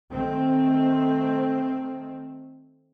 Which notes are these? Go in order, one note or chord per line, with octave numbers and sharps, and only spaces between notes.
D#3 A3 C4